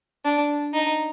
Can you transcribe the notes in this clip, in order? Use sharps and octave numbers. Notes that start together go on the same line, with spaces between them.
D4
D#4